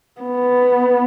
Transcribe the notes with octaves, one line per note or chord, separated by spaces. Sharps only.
B3